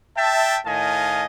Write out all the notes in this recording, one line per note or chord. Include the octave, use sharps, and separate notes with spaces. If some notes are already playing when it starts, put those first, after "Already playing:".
E5 G5 A5
A2 D#3 D#5 F5 G#5 A5